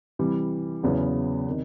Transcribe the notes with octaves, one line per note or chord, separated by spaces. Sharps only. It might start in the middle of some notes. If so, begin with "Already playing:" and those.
C3 E3 G3
E2 C#3 F#3 B3 E4
C3 D#3